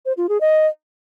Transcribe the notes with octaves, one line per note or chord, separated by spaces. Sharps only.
C5
F4
G#4
D#5